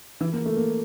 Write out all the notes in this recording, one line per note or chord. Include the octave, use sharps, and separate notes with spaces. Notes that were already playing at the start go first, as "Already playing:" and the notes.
E3
A#3
A3
A#3